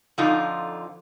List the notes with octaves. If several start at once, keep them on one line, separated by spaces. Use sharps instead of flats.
F2 D3 F3 D#4 F4